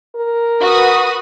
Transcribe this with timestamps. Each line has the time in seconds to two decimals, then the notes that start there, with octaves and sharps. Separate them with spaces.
0.16 A#4
0.62 F#4 B4 D#6